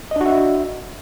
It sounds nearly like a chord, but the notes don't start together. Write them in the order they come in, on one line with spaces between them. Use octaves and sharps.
D#5 D4 F#4 E5